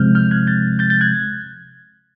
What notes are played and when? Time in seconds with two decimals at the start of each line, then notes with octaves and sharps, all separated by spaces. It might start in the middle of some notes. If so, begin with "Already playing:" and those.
Already playing: C3 F3 G#3 C4 F6 G6
0.15 F6 G6
0.31 F#6 G#6
0.47 G6 A6
0.79 G6 A6
0.90 G6 A6
1.01 F#6 G#6